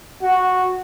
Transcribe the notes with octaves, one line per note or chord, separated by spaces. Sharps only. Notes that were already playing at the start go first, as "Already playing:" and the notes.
F#4